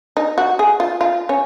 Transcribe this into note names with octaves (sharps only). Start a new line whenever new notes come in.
D#4
F#4
G#4
F4
F4
C#4